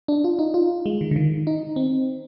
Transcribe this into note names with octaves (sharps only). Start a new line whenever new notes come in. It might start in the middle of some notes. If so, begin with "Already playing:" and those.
D4
F4
D#4
F4
G#3
D#3
D3
D#3
D#4
C4